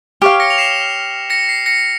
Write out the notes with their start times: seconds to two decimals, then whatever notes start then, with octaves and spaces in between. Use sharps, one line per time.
0.22 G4 C#5 F5 F6
0.40 A#6 C#7
0.50 F7
0.58 C7 E7
1.30 A#6 C#7
1.49 C7
1.66 A#6 C#7